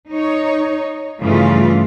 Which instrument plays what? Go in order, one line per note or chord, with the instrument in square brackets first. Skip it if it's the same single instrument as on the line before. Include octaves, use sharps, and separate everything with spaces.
[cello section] D#4 C#5
G2 C#3 E3 A3 F4